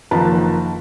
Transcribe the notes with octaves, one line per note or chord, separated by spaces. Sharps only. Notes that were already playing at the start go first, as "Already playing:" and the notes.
F#1 D#3 F3 B4 A5 A#5